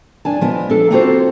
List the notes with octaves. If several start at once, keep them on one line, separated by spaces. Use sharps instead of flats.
F2 D4 G#5 A5
F3 B3 D#5
D4 A4
A#3 C4 F4 F#4 A4 C5